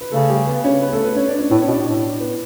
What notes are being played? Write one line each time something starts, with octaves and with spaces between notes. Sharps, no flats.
B4
C#3 A3 A4
G3 G4
B3 B4
C#4 C#5
B3 B4
A3 A4
B3 B4
C#4 C#5
D4 D5
C#4 C#5
A2 B3 B4
C#4 C#5
B2
D4 D5
A2
B3 B4